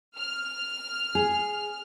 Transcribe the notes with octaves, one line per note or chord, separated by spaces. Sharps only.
F6
G#4